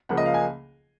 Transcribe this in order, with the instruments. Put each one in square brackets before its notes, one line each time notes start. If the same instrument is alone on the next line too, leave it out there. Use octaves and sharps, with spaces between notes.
[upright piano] C#2 C#3 F3 A#3 F#5
D#5
F5
G#5